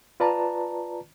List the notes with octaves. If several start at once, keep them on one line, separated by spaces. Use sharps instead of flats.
F4 B4 D5 A5 A#5